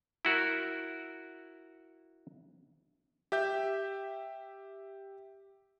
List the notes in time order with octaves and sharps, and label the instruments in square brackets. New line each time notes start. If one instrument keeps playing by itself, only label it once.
[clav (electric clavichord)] E4 F#4 A#4
[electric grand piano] G4 E5 G6